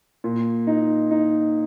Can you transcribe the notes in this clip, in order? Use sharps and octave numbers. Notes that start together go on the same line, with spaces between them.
A#2
D#4
D#4